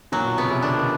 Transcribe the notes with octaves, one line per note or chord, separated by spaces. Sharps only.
A#2 F#3
B2
C3 B3
C#3
C3
D3 D4
D#3